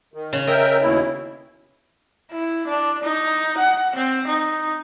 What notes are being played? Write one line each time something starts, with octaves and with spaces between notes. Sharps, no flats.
D#3
C#3
A#4 D#5 E5 G5
D#2 B2 E4
E4
D4
D#4
F#5
C4
D#4